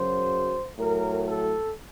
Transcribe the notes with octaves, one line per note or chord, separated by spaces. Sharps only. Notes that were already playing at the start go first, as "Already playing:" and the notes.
Already playing: F#2 C#3 F#3 C5
A2 F#3 A#4
A4